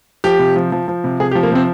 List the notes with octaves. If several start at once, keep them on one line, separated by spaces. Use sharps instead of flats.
F3 G4
C3
F3
F3
F3
C3
C3 G#4
G4
F3
A#3
C3 C4